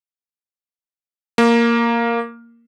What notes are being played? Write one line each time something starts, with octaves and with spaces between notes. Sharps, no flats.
A#3